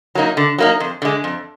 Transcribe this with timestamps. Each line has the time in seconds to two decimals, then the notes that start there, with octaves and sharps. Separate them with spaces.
0.15 F#3 A#3 D#4
0.37 D3
0.58 F#3 A#3 D#4
0.80 F2
1.02 D3 G#3
1.24 F2